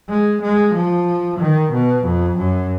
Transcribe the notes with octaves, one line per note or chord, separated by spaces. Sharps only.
G#3
G#3
F3
D#3
B2
F2
F#2